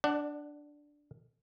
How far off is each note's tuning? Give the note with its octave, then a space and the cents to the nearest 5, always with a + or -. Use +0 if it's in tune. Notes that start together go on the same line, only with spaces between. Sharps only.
D4 +0 D5 +30 F#5 +20